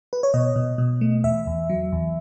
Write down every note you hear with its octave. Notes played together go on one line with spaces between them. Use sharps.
B4
C#5
B2 D#5
B2
B2
A3
E2 E5
E2
F#3
E2